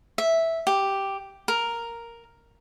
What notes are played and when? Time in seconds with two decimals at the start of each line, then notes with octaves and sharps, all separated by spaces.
0.18 E5
0.67 G4
1.48 A#4